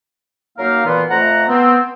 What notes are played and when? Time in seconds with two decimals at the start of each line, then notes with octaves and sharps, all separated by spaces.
0.58 F#2 F#3 A#3 D#4 A#4 F5
0.85 A#2 E3 B3 C6
1.09 F2 A3 F#5 A#5
1.47 B3 C4